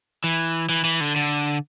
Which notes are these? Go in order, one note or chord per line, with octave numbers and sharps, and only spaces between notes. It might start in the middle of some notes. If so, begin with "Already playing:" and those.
E3
E3
E3
D3
D3